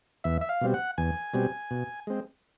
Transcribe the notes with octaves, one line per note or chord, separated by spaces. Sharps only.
E2 E5
E5
F5
B2 G3 C4
F#5
E2 G#5
B2 G3 C4
B2
G#3 C4